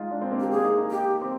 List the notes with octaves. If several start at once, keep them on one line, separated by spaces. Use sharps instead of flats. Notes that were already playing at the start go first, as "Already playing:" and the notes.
Already playing: G#3 D#4 F4
D4
C4
A#3
G4
A#3 G#4
D#4
D#4
G4
C4